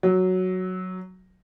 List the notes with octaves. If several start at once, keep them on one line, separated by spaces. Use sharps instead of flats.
F#3